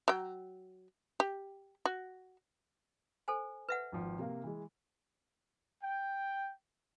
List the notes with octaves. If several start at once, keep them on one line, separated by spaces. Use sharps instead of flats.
F#3 G5
G4
F#4
A4 C5 G#5
B4 E5 F#5
G#1 F3
C3 A#3 F5
E3 G#3
G5